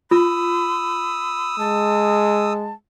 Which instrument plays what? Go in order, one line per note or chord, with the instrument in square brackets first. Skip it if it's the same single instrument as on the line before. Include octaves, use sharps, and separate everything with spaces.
[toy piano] F4 [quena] B5 [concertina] D#6 E6
[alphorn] G#3 [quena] A5